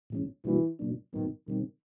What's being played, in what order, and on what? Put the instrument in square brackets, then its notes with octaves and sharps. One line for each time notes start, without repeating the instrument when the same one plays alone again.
[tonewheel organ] A2 E3 G#3 C#4
[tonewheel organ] B2 G3 A#3 D4 F#4 [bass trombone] E3
[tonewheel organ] B2 F#3 A#3 D4
[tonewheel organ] A2 F#3 B3 [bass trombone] D#3
[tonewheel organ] B2 G3 C4 [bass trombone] D#3